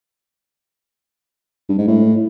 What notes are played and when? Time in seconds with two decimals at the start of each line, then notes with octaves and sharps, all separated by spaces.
1.69 G2
1.78 G#2
1.88 A2